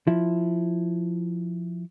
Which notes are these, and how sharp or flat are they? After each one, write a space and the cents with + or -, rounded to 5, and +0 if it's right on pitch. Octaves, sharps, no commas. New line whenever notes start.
F3 +0 E4 +0